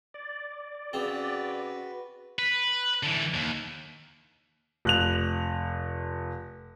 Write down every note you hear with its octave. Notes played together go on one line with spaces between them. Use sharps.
D5
C#3 C4 F#4 B4
B4
D3 E3
D#2
F1 F#6 F7